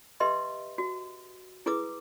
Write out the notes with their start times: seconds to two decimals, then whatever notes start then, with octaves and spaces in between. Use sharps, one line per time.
0.20 G4 B4 D#5 E5 C6
0.78 F#4
1.66 E4 G#4 B4 D6 D#6